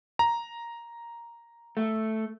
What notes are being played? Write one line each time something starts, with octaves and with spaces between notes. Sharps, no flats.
A#5
A3